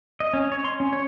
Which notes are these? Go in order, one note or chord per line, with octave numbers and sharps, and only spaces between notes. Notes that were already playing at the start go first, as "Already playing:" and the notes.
D#5
C#4
C#5
C6
C#4
C#5